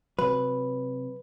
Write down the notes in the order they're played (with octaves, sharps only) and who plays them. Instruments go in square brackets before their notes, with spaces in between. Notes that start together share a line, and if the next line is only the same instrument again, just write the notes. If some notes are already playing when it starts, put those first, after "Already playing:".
[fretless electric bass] C3 F#3 [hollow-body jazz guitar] B4